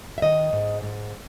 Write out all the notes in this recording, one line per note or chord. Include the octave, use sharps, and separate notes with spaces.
E5
D#3 D#5
G#2
G#2